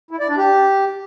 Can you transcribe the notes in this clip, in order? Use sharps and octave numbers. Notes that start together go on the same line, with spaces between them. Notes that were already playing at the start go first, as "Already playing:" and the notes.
E4
D5
D4
G4